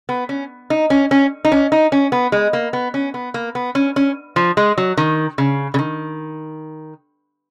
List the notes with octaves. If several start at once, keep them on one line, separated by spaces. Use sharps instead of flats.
B3
C#4
D#4
C#4
C#4
D#4
C#4
D#4
C#4
B3
G#3
A#3
B3
C#4
B3
A#3
B3
C#4
C#4
F3
G#3
F#3
D#3
C#3
C#3
D#3